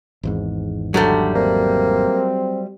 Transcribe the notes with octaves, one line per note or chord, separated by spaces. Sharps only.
G#1 E2 G#2
D3 F#3 G3 A3
A#3 C4